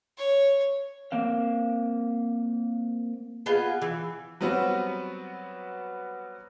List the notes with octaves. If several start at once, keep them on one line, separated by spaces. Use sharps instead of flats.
C#5
A#3 C4 F5
B3 F4 G#4 D#5
E3
F#3 G3 B3 C4 F#4 B4